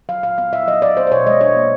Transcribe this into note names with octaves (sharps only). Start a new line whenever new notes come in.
F#3 F5
A#2 F5
B3 F5
A#2 E5
F#3 D#5
D4 D5
B3 C5
C5
B2 C#5
G#3 D#5
D4 C#5
A#3